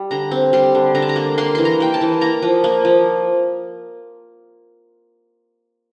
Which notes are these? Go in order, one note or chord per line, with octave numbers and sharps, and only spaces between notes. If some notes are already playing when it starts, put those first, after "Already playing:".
Already playing: G3
D3 A#5
C4
G3 C6
D3
D3 A#5
A5
A#5
A#3
A#3 C6
E3 C6
A#5
A#3 G5
A5
E3
A#3 A#5
F3
A#3
F3